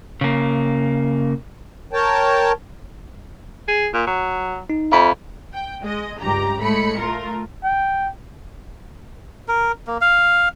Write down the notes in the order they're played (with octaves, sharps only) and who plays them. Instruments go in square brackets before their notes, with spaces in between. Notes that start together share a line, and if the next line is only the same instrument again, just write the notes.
[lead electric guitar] C#3 A#3
[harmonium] A#4 C#5 G5 A5
[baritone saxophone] G#4
A#2
F#3
[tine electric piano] D#4
[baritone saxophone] F2 [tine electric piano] E5 F5 B5
[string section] G5
G#3 D#5
C#2 G2 G4 A#5
A2 G#3 A3 B5 C#7
A3 F4 A#4
[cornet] G5
[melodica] A#4
A#3
F5